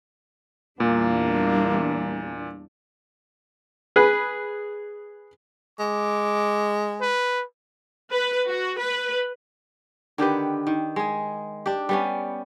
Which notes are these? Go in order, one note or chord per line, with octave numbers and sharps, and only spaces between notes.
E2 A#2 G3 A#3 D4
G#4 B4
G#3 D6
B4
B4
F#4
B4
D3 D#3 G4 B4
D#3
G#3 G#4
D4 G4
G3 B3 C#4